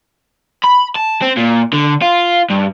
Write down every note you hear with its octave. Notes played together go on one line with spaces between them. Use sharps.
B5
A5
C4
A#2
D3
F4
G2